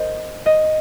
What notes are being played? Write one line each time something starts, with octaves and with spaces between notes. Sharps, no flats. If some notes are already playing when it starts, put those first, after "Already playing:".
Already playing: A#4 C5 D#5
D#5